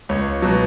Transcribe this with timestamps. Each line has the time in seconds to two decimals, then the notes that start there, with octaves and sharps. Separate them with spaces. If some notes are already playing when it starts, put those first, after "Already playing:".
0.09 C#2 C#5
0.42 B2 F#3